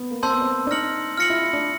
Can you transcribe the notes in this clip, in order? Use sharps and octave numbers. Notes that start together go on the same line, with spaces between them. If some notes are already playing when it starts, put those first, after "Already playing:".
Already playing: B3
A#3
C4 A5 C6 E6 G6
B3
C4
D4
D#4 F6 A#6 C#7 F#7
F4 F6 A#6 C#7 F#7
E4
E4
D4